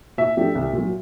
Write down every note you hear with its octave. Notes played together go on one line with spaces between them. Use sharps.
A#2 E5
F3 A3 D4 G4
C2
A#2 F#3